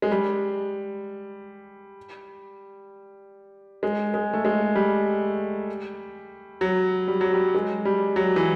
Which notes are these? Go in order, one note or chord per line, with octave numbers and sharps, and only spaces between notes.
G#3
G3
G#3
G#3
A3
G#3
G3
F#3
G3
F#3
G3
G#3
G3
F#3
E3